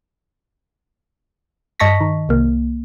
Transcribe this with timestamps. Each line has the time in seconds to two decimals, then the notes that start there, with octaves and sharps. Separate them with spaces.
1.80 G2 D#5 A5 C#6 A#6 B6
2.01 D#3
2.29 C2 A#3